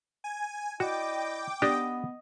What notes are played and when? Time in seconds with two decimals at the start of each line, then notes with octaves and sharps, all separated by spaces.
0.24 G#5
0.80 E4 F#4 D5 D#5 G5 D6
1.62 B3 D4 G4 D#5